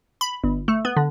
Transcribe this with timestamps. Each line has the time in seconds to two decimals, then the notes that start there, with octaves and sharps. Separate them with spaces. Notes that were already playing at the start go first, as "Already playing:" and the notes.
0.21 B5
0.44 G1
0.68 A3
0.85 B3
0.97 D3